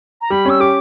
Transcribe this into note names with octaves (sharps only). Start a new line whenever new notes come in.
A#5
G3 B5
C#4 E6
G4 D6